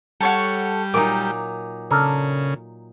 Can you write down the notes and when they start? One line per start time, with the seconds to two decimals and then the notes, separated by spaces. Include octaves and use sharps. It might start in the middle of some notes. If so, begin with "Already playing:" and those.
0.21 G3 A4 C#5 F#5
0.94 A#2 F#3 D#4 D6
1.91 C#3 D4 A4 A#4